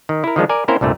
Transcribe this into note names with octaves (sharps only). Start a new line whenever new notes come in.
D#3
E4 A#4
D#3 F3 G#3 D4
A#4 D5 G#5
A#3 C4 C#4 E4 A#4 C5
C2 G2 A#2 A3